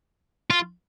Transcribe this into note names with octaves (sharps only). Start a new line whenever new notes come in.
F4